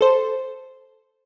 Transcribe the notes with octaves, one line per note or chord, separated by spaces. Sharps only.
A4 C5